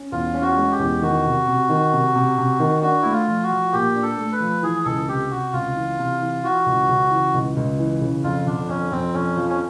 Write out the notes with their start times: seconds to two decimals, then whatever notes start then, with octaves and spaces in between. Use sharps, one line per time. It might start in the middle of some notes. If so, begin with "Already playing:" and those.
Already playing: C#4
0.12 E2 F4
0.34 C#4
0.42 F#4
0.57 G#3
0.72 G4
0.79 E2
1.02 D#3 F#4
1.25 C3
1.47 C3
1.69 D#3
1.92 C3
2.15 C3
2.38 C3
2.60 D#3
2.82 D4 F#4
3.02 A3 E4
3.12 F4
3.28 F3
3.43 F#4
3.50 F3
3.73 A#2 G4
3.95 D4
4.03 A4
4.18 A3
4.32 B4
4.40 F3
4.63 E3 G#4
4.85 C#2 A4
5.08 C3 G4
5.30 C3 F#4
5.53 C#2 F4
5.76 E3
5.98 C3
6.21 E3
6.43 E3 F#4
6.66 C#2
6.89 C#3
7.11 E3
7.34 C#2
7.56 C#2
7.79 E3
8.01 C#3
8.24 F2 F4
8.46 D3 D4
8.69 F2 C#4
8.91 F2 C4
9.14 F2 C#4
9.37 F3
9.49 C#4